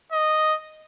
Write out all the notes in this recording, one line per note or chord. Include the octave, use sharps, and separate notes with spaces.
D#5